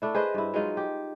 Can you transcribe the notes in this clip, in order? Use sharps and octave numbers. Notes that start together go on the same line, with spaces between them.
A3 D4 E4
G#4 B4 C5 D#5
G2 E4
F#3 G#3 D#4 F4
G4